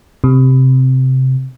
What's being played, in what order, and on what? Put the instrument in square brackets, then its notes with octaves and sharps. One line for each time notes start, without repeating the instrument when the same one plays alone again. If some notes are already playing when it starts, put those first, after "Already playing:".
[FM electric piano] C3